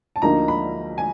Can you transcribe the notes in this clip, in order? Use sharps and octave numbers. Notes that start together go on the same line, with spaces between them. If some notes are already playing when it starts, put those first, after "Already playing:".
A5
D2 D3 F3 A#3 D#4 A#5
B5
G#5